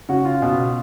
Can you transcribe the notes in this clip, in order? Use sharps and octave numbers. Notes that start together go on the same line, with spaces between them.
C#3 F#4
F4
B2